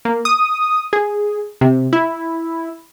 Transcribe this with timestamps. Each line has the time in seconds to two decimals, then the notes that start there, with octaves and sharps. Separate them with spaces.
0.05 A#3
0.25 D#6
0.93 G#4
1.61 C3
1.93 E4